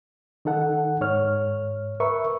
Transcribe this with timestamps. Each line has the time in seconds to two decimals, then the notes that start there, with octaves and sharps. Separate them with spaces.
0.45 D#3 D#4 A4 F#5
1.01 G#2 C#5 F6
2.00 A#4 B4 E5 C#6